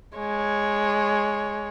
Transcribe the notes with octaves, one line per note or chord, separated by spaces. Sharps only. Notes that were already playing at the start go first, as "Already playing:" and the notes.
G#3 C#5